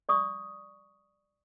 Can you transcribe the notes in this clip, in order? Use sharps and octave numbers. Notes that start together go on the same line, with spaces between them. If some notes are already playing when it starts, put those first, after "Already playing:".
D5 C#6 D#6